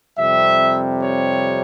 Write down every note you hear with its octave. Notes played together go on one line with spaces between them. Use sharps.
F2 C3 G3 E5
C#5